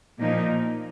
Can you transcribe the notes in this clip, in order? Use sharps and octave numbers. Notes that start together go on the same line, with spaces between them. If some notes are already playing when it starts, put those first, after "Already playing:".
A#2 F3 A#3 D#4